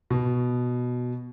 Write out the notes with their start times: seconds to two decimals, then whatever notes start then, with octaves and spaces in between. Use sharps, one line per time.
0.10 B2